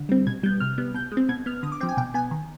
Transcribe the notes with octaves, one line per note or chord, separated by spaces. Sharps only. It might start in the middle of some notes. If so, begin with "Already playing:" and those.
Already playing: D3
G3 C4
B2 G#6
G3 B3 G6
C3 F6
G3 B3
B2 G6
G#3
C4
B2 G#6
B3 F6
D3 D#6
D6
F3 C4 G5
G#5
B2 G5
B3 G#5
D#3